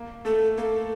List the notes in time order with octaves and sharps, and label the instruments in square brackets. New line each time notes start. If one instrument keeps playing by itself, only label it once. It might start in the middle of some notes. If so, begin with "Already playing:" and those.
Already playing: [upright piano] A#3
[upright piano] A3 [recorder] A4
[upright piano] A#3 [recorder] A4